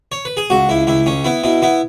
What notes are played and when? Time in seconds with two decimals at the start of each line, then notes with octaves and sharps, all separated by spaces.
0.12 C#5
0.25 B4
0.37 G#4
0.50 C#2 F#4
0.69 C#2 E4
0.87 C#2 E4
1.06 C#2 C#4
1.24 B3 E4
1.44 B2 E4
1.62 B3 E4